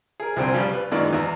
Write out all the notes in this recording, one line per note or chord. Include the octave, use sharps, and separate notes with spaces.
G#4 A#4
C2 F2 D3 C4 G#5
C#3 F3 G3 F4
B4
F#2 A#2 D#3 E3 G#3 D5
E2 A#5